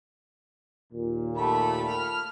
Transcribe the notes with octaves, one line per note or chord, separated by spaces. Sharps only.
D#2 A#2
A3 G4 B5
F6